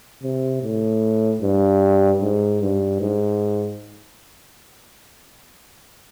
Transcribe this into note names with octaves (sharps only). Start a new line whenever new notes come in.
C3
A2
G2
G#2
G2
G#2